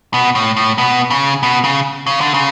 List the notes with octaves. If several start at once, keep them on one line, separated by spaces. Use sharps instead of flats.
B2
A2
A2
B2
C#3
B2
C#3
C#3
D3
C#3